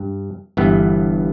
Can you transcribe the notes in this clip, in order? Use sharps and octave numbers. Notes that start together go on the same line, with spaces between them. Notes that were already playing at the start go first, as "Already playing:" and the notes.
Already playing: G2
G1 G2 E3 B3